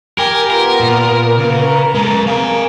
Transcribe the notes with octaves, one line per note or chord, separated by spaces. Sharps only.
G4 A#4 G#5
B3 F4 A#4
A#2
C#3 B4 A#5
G#3 A4
A#3 F5 G#5